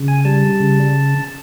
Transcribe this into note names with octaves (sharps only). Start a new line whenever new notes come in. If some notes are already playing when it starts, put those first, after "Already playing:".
Already playing: C#3
G#5
G3 A5
C#3